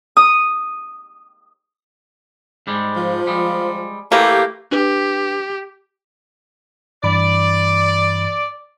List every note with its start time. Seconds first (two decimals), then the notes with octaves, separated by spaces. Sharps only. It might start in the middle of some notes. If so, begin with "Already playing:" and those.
0.17 D#6
2.67 G#2 G3 G#3
2.95 F3
3.27 G3 G#3
4.12 E3 A3 A#3 G4
4.72 D4 G4 B4
7.04 G2 E3 D5 B5